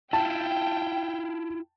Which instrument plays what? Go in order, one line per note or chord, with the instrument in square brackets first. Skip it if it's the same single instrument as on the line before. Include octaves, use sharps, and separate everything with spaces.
[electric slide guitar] E4 F4 [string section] G5 [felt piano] A5